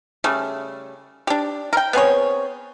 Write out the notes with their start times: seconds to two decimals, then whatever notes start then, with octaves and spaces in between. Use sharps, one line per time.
0.24 C#3 G3 A3
1.27 D4 G4
1.73 A#4 G5
1.93 B3 C4 G#4 C#5